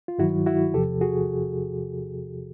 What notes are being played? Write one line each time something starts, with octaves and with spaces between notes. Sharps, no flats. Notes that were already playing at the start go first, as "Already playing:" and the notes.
F4
G2 D#3 F#3 E4 F#4
E4 F#4
E2 C3 F3 G4 A4
F#4 G#4